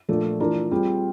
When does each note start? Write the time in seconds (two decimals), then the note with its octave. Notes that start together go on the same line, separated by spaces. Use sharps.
0.08 A#2 F3 A3 D4
0.40 E3 A3 D4 F4 A#4
0.71 G3 C4 F4 G#4